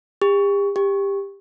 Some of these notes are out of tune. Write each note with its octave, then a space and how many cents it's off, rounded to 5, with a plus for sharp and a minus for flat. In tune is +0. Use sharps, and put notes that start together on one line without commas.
G4 +40
G4 +20